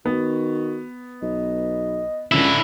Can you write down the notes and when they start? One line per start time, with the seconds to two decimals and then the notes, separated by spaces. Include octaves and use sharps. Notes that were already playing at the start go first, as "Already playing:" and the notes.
0.06 D#3 B3 F#4
1.22 B1 D#5
2.32 C#2 D3 C#4 E4